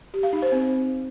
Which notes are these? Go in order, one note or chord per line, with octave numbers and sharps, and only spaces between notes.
G4
F5
D#4
C5
C4